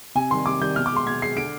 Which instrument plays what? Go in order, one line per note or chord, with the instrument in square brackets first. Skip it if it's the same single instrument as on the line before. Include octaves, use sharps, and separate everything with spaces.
[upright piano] C3 G#5
D#3 G3 C6
C3 D6
D#3 G3 G6
B2 F6
D6
G#3 C6
B2 G#6
G#3 C7
D3 D7